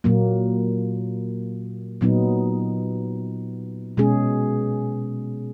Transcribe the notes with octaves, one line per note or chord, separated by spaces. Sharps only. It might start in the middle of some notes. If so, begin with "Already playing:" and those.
A#2 F#3 A#3
A#2 F#3 B3 D#4
B2 G#3 C#4 G#4